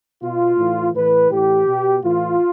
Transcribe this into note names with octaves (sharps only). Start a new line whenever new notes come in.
B2 F4
A2 E3
A2 E3 B4
A2 E3 G4
B2
A2 E3 F4